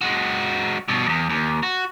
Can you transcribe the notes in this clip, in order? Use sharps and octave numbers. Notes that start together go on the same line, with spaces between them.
G#3 F#4
G2 B2
E2 G#2
D#2
F#4